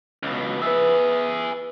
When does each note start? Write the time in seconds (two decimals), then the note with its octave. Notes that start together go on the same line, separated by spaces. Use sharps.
0.23 C#2 B2
0.62 E4 G#4 B4 E5